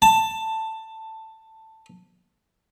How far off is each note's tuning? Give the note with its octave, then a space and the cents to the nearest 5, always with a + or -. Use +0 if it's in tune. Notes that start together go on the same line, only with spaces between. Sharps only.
A5 +10